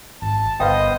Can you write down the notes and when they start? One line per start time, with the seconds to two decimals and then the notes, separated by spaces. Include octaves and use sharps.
0.22 G#1 A5
0.60 G1 B3 B4 C5 D#5 F5 G5 D#6